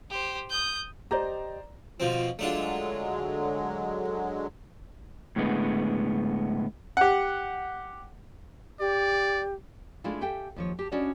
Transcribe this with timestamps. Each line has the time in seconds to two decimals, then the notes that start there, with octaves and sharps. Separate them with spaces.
0.10 G4 C5
0.50 D#6 G6
1.11 G4 C5 D5 D#5 A#5
2.00 B2 F3 C4 F4
2.39 D3 F#3 G#3 A3 D4 F4
5.36 A2 D3 G#3 B3
6.97 G4 F#5
8.80 G4 D5
10.04 G#3 A3 D4 E4 F4
10.21 G4 A4 E5 G5 G#5
10.56 D#2 F3 C#5
10.79 G4 A5
10.92 C#4 D4 E4 F#4 D5 D#5